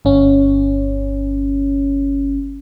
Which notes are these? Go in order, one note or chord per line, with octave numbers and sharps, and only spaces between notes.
G1 C#4